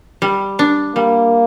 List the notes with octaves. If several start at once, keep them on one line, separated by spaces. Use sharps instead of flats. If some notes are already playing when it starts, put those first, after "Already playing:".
G3
D4
G3 A#3